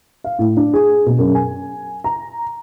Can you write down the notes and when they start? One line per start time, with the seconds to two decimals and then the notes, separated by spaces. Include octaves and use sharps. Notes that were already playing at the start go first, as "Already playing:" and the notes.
0.24 F5
0.39 A2
0.57 D4
0.73 G#4
1.06 B2
1.18 F#2
1.35 G#5
2.04 A#5